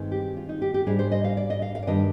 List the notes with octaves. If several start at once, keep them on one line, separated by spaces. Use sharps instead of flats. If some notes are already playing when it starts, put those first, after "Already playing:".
Already playing: G2 D#3 G#3 C4 D#4
G4
F4
D#4
G4
G4
G#2 G3 D4 G#4
C5
D#5
F5
D5
D#5
F5
F5
D5
G2 D#3 G3 D4 D#5